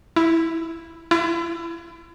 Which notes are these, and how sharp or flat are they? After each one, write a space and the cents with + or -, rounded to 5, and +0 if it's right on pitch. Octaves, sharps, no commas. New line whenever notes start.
E4 -5
E4 +35